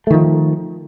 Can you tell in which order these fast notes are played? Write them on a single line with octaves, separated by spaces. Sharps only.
A3 D#3 F3